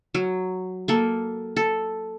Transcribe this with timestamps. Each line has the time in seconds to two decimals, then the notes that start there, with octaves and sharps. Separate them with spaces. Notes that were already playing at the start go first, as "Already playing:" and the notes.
0.14 F#3
0.88 A#3 A4
1.56 A4